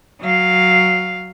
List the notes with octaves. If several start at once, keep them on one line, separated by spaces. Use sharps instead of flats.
F#3 F5